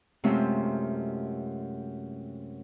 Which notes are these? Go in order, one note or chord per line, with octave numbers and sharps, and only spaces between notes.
F#2 C3 G#3 A3 C4 F4